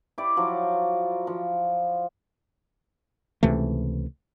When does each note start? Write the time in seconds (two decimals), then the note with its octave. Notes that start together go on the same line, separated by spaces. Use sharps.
0.18 E4 G4 D5
0.37 F3 F#3 F#4
1.27 F3
3.43 C#2 C3 E3 A3